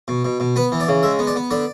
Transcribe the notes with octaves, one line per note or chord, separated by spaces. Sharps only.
B2
B2
B2
B3 B4
E3
D5
C#3
G#3 E5
B3
D5
B3
D3 D5